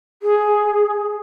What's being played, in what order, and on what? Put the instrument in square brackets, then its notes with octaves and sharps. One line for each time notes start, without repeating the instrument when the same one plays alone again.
[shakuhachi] G#4